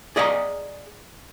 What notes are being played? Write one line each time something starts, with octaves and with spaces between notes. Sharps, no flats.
G#4 D5 D#5 F5 G5 A#5